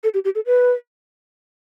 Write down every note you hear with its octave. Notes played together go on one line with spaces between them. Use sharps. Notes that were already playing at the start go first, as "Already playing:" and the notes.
A4
G4
G4
A4
B4